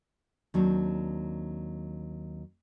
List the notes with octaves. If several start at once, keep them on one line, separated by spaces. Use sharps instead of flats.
D#2 F#3 C4 D4